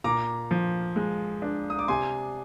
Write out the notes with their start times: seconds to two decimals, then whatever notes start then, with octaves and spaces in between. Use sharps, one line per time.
0.04 A#2 A#5 D6
0.51 F3
0.96 G#3
1.42 D4
1.70 D#6
1.79 D6
1.88 C3 G#5 C6